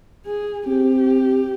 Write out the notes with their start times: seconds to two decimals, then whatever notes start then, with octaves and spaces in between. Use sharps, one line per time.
0.26 G#4
0.67 C4 G4